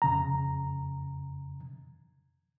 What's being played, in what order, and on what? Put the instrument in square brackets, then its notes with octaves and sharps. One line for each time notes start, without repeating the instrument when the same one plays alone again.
[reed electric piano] F2 C#3 A#5